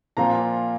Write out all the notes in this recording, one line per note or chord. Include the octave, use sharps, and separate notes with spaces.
A#2 F3 C4 F4 A#5